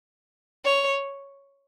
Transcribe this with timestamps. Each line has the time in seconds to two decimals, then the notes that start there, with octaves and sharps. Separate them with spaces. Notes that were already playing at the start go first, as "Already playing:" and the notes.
0.65 C#5